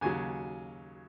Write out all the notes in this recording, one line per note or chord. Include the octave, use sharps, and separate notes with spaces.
D#2 C#3 F#3 G#5